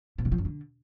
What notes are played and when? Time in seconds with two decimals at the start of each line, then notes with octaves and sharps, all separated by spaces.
0.18 B2
0.25 D#3
0.32 F3
0.38 F#2
0.45 D3